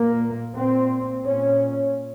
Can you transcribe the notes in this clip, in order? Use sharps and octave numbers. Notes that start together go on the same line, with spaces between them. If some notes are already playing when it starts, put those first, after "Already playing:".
Already playing: A#2 A#3
A#2 C4
A#2 C#4